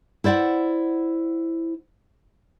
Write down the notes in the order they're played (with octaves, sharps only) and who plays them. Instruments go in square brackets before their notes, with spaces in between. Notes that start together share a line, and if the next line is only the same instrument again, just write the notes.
[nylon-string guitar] E4 C5 D5 F5 F#5